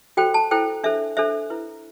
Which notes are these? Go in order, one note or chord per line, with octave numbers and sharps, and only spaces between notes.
F#4 A4 C5 G5
A5
E4 A4 C5 G5
D4 A4 C5 E5
D4 A4 C5 E5
E4 B4